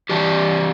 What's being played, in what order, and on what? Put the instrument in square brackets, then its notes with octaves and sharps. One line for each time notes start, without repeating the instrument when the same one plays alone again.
[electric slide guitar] E3 G3 D4 G4